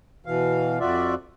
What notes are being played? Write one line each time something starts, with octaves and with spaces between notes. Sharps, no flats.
B2 E3 F5
F2 F4 F#4 D5 E5